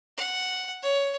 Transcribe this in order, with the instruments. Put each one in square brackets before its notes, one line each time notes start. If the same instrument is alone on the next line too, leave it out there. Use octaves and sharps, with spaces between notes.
[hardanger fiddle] F#5
C#5